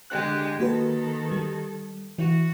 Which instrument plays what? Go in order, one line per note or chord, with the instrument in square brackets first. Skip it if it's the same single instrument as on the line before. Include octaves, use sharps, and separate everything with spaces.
[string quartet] D3 G#3 G4 [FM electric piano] F#6
[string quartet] D#3 A4 [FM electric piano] A#3 F#4 B4
[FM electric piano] G3
[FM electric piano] E3 [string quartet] F#4